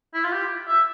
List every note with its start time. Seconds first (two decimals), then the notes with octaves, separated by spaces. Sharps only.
0.14 E4
0.24 F4
0.32 G4
0.68 E5